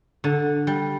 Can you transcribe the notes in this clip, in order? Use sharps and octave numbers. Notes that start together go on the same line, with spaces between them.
D3
G3